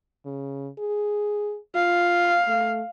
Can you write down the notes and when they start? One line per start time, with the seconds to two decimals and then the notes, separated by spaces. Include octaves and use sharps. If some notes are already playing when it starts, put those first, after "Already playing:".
0.26 C#3
0.79 G#4
1.75 F4 F5
2.48 A3